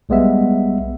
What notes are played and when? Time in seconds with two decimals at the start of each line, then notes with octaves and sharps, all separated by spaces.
0.09 B1 G3 G#3 B3 E5